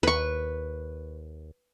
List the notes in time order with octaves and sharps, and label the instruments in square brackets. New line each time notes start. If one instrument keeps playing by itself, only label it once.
[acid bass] D#2 [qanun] B4 C#6